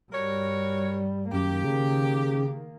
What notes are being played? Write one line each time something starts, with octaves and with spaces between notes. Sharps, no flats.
G2 G3 F#4 A#4 C#5
F#2 D#3 A#3 G4
C#3